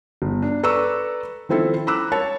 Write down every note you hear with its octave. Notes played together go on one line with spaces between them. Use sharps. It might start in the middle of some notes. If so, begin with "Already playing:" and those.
G1
D4
A4 B4 D5 A#5 C#6 E6
D#3 F3 C4 E4 A4
A#5 B5 D6 E6 F#6
C#5 A5